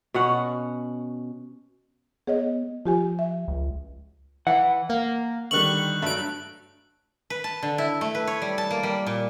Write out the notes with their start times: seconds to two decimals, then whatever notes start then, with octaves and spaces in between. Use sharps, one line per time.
0.14 B2 C#4 F#5
2.27 B3 G#4 C#5 D#5
2.85 F3 F4 G4 G#5
3.19 E5
3.48 C#2
4.47 E3 F#5
4.89 A#3
5.51 D3 D#3 G3 C#6 F#6 F#7
6.02 G2 F#3 A3 D7
7.30 B4
7.44 A5
7.63 D3
7.78 E4
8.01 A3
8.15 B4
8.27 C#5
8.42 G3
8.58 A5
8.71 A#3
8.83 G3
9.06 A#2